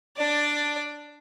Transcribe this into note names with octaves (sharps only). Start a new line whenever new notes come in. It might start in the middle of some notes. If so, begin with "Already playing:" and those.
D4 D5